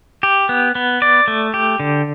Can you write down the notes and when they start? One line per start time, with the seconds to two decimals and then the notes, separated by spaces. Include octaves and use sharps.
0.23 G4
0.49 B3
0.75 B3
1.02 D5
1.28 A3
1.54 G4
1.80 D3